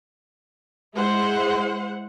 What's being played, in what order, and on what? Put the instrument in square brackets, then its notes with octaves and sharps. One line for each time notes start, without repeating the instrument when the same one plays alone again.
[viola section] G#3 E4 C5 F#5